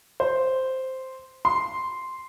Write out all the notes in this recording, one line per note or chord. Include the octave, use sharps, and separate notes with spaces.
C5
C6